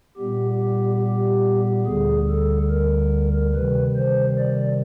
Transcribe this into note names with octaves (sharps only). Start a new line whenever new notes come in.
A#2 G3 B3 G4
G4
G4
D2 D3 G3 G#4
A4
A#4
C3 D#3 G3 B4
C5
D5